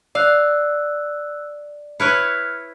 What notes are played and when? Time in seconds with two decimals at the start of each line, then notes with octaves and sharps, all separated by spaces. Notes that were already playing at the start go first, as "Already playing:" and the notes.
0.15 D5 F5 E6 F#6
2.00 E4 B4 C#5 F6 F#6 C#7